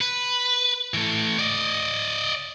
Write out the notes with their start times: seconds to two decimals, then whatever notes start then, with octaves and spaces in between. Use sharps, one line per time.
0.01 B4
0.94 E3 A3
1.39 D5 D#5